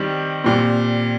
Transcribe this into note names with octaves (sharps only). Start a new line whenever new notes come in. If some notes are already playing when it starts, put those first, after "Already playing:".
Already playing: D#3 G3 C4 G4
A#2 G3 C4